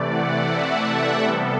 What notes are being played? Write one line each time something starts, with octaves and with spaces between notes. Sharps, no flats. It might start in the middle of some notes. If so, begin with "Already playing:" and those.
Already playing: C3 E3 A3 D5
F#5
E5
A4
C3 G3 B3 A4